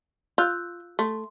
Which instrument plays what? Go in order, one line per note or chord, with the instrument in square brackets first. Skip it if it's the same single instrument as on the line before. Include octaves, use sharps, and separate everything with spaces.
[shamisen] F4 [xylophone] E6 F#6 G6
[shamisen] A3 [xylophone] C6